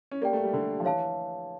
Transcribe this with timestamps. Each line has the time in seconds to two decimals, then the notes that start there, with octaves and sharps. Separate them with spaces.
0.11 C#4
0.22 A#3 G4 D5 G5
0.33 A3
0.44 G3
0.53 D3
0.80 F3
0.85 E3 C#5 F5 A5